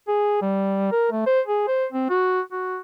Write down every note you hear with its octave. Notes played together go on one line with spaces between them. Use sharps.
G#4
G3
A#4
A3
C5
G#4
C5
C4
F#4
F#4